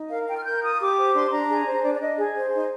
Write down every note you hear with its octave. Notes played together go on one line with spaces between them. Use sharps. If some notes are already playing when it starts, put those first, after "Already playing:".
Already playing: D#4
A#4 F5
F4 G5
F6
A#4 G6
F4 D#6
G4 D6
C5
D4 C6
D4 A#5
G#4
C5
D4 D5
D5
D4 D#5
G#4
C5
D#4